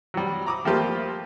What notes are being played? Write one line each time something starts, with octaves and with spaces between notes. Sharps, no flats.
F#3 G3
A#5 D6 D#6
F3 G3 A3 A#3 F4 G4